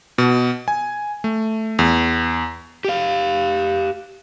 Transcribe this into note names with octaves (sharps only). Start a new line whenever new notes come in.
B2
G#5
A3
E2
G4 F5